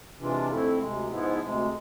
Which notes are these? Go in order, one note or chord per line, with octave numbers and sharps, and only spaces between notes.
C3 E3 G#3 D4 F4
F2 D3 A3 C4 E4
D2 C3 G#3
G#2 F3 G#3 B3 E4
D2 C3 G#3